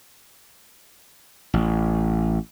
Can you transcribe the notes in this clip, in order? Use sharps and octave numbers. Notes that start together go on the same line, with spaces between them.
A1